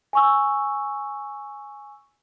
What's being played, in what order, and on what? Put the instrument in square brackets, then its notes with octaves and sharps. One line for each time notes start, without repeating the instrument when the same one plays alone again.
[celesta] G#5 C#6 E6